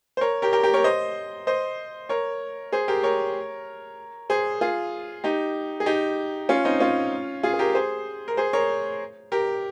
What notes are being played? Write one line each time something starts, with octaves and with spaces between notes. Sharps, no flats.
C5
A#4 C#5
G4 A#4
G4 A#4
G4 A#4
A#4 C#5
C5 D#5
C5 D#5
A#4 C#5
G#4 C5
G4 A#4
A#4 C#5
G#4 C5
F4 G#4
D#4 G4
G#4
D#4 G4
C#4 F4
C4 D#4
C#4 F4
F4 G#4
G#4
G4 A#4
G#4 C5
A#4
G#4 C5
A#4 C#5
G4 A#4